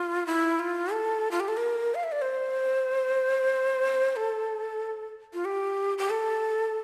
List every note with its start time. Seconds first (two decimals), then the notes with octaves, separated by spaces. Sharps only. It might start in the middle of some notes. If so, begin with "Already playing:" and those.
Already playing: F4
0.27 E4
0.59 F4
0.92 A4
1.31 F4
1.40 G4
1.48 A4
1.57 A#4
1.95 F5
2.04 E5
2.12 D5
2.22 C5
4.16 A4
5.34 F4
5.45 G4
5.98 G4
6.10 A4